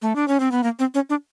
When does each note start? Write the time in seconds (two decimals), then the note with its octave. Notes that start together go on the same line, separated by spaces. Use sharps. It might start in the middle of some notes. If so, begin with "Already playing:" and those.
0.02 A3
0.16 D4
0.28 C#4
0.40 C4
0.52 B3
0.63 A#3
0.79 C4
0.94 C#4
1.10 D4